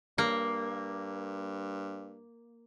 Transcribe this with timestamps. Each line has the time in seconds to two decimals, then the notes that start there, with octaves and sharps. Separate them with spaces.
0.18 G2 A#3